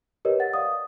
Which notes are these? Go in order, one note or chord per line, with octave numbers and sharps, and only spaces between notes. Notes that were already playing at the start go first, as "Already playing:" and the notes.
G4 A#4 B4 C#5 D#5
F#5 A6
D5 F5 D#6